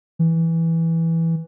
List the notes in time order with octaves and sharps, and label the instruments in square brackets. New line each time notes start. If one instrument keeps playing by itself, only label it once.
[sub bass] E3